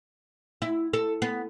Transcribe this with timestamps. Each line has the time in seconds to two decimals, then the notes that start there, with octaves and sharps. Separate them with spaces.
0.62 E4
0.93 A4
1.22 B3